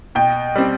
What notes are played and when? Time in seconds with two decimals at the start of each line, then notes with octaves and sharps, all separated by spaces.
0.15 B2 G5
0.56 G3 C4